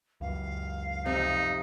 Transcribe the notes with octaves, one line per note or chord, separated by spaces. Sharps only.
C#2 F#2 F5
F2 C3 D#4